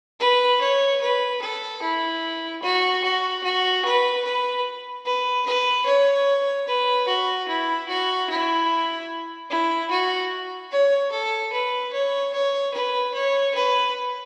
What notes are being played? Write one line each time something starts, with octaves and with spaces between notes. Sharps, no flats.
B4
C#5
B4
A4
E4
F#4
F#4
F#4
B4
B4
B4
B4
C#5
B4
F#4
E4
F#4
E4
E4
F#4
C#5
A4
B4
C#5
C#5
B4
C#5
B4